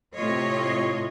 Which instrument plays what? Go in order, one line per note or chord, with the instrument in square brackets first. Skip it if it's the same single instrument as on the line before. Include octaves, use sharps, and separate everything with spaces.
[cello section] A2 C3 F4 C#5 D#5